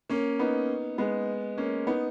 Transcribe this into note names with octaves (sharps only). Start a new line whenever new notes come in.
A#3 C#4
B3 D#4
G#3 B3
A#3 C#4
B3 D#4